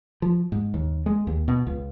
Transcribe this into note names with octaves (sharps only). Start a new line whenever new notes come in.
F3
G#2
D#2
G#3
D#2
B2
C#2